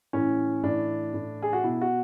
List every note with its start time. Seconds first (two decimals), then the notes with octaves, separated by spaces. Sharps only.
0.13 A2 E3 C#4
0.63 A2 E3 D4
1.14 A2 E3
1.42 G#4
1.53 F#4
1.64 B2 E4
1.81 F#4